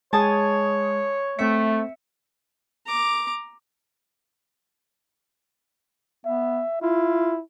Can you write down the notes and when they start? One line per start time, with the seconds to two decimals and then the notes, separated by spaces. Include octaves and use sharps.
0.13 G#3 G#4 C#5 G#5 A5 D#6
1.39 A3 C4 E5 C#7
2.86 A#5 D6
6.26 B3 E5
6.82 E4 F4